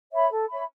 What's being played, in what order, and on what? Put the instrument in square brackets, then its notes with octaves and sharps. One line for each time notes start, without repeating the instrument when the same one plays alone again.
[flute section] C#5 E5 B5
A4
C#5 E5 B5